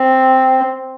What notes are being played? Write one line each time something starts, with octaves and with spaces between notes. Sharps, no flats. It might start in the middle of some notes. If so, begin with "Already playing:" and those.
Already playing: C4